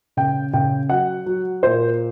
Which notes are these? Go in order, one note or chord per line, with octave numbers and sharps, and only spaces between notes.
C#3 G5
C#3 G5
F#3 F#5
F#3
A#2 C5